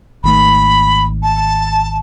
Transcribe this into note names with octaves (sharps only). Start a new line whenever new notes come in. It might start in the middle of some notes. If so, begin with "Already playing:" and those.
G#1 D#3 A3 B5
A5